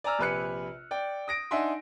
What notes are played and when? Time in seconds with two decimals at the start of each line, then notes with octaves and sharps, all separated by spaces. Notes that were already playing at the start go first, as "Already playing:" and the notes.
0.04 D5 G#5 A#5 E6 F6
0.19 A#1 C3 B4 G#5 F#6 C#7
0.91 D5 G5
1.28 D#6 A#6 D7
1.51 D4 D#4 E5 F#5 G#5 C6